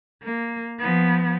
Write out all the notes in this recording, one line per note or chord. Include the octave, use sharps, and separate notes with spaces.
A#3
F3 B3